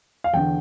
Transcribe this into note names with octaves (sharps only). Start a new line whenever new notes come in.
F5
E2 D3 G5